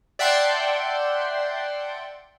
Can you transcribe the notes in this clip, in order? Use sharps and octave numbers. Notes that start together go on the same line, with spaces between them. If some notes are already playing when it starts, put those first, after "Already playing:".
D5 E5 F#5 G5 A5 C6